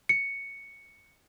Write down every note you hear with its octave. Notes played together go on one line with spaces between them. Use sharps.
C#7